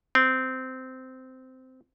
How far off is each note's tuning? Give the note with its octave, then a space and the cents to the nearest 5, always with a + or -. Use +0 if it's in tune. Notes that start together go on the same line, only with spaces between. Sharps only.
C4 -15